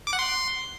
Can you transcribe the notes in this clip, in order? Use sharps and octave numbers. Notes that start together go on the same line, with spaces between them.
D6
F#5
C6